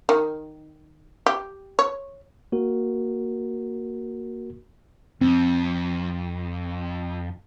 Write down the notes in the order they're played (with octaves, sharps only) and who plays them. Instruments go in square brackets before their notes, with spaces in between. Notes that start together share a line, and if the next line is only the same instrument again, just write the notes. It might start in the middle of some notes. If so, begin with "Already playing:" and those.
[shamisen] D#3
G4
C#5
[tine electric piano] A#3 F#4 A#4
[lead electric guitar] F2 [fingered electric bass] C4